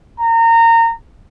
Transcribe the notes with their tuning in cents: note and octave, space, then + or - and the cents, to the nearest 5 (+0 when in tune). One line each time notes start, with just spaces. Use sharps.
A#5 -25